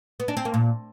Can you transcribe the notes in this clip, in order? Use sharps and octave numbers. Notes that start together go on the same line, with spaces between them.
B3
D4
C4
A#3
A#2